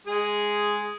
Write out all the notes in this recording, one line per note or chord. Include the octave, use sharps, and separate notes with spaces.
G#3 G#4